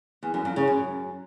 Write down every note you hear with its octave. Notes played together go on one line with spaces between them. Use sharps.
E2
F#2
F2
C#3
F#2